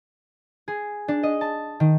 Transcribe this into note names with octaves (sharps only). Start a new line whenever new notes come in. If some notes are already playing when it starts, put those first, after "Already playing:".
G#4
D4
D#5
A5
D#3